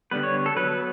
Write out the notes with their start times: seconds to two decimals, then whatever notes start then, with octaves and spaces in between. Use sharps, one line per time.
0.11 D3 G3 B3 B4
0.23 C#5
0.46 A4
0.57 F#3 B3 B4